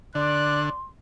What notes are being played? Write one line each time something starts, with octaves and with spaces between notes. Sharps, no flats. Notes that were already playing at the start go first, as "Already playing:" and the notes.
D3 D5 C6 F#6